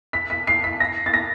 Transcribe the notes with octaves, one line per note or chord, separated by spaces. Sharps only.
B6
B6
C7
B6
A#6
A6
A#6